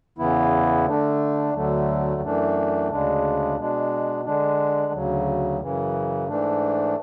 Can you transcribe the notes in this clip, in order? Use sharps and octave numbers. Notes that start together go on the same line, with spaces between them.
E2 C#3 E3 B3 E4
D3 A3 D4
D2 D3 F#3 A3
F#2 E3 A3 D4
D2 C#3 G#3 D4
B2 G#3 D4
D3 G#3 D4
D2 C#3 F#3
F#2 C#3 E3
G#2 E3 A3 D4